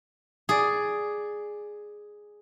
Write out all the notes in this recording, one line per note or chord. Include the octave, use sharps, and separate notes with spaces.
G#4 D5